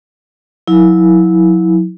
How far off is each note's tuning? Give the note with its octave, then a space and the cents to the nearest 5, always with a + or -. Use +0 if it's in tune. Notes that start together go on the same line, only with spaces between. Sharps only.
F#3 -30 E4 -20